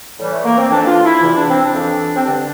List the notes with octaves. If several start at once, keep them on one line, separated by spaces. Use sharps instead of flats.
A2 E3 G3
A3
A#3
C4
F2 E3 D4
F4
E4
E2 C3 E3 E4
D4
C4
D4
F2 E3
C4
G2 D3 D4